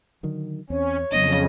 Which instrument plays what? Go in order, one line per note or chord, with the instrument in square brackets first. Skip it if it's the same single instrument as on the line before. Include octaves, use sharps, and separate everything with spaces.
[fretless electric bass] D3 D#3 F#3
[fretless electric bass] E2 C4 [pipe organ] C#4 [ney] C#5
[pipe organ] F2 C#3 [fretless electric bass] F#3 B3 D4 [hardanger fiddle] D#5